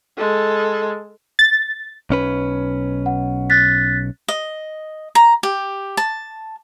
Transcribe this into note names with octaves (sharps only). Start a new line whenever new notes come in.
G#3 A4
A6
B1 C#4 B4
F#5
F#6 A6 B6
D#5
A#5
G4
A5